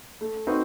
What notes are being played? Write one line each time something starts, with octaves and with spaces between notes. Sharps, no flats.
A3
C4 D#4 F#4 B4